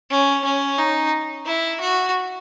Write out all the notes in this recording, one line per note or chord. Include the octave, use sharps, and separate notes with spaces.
C#4
C#4
D#4
E4
F#4